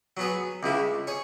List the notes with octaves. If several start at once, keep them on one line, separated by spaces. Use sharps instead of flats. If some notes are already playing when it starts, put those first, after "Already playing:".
F#3 B3 G#4
C#2 C#3 G#3 E4
G#4 C#5